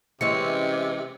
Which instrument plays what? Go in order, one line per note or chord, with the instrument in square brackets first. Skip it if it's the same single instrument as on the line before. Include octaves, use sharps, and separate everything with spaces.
[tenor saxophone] C3 [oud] E3 G#3 C#4 [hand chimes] C#7